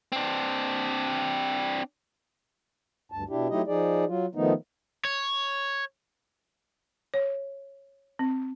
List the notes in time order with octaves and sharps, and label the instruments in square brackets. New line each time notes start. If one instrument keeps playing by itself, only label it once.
[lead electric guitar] C4 D4
[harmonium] D2 G2 A5
B2 D4 E4 G4
F#3 A3 D#4 E4 G4 D#5
F3 D#4 G#4 D5
F#3 F4
D#3 F3 A3 B3 D#4
[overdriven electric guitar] C#5
[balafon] C#5
C4